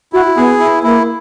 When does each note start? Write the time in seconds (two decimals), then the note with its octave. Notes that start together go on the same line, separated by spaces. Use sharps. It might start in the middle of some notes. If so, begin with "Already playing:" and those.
0.13 E4 F#4
0.36 B3 G#4
0.59 E4
0.83 A#3 E4